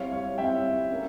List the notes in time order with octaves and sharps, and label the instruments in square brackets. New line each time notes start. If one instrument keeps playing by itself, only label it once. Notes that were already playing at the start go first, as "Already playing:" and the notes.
Already playing: [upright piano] G3 C4 E4 [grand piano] C#5 F5
[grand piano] C#5 F5
[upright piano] G3 C4 E4 [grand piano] E5 G5
[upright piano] A#3 C#4